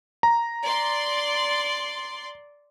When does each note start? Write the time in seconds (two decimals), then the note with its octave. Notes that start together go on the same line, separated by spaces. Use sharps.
0.23 A#5
0.63 D5 C6